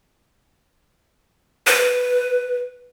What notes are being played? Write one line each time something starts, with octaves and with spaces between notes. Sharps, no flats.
B4